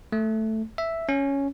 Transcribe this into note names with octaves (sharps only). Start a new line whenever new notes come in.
A3
E5
C#4